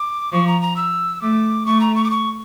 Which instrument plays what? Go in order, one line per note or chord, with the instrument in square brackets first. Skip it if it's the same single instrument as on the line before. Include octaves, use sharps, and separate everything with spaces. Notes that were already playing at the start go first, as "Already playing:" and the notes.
Already playing: [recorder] D6
[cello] F3 [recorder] C#6
[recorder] A#5
A#5
E6
[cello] A3 [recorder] D6
[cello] A3 [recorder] C#6
[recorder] A#5
C#6
D6
C#6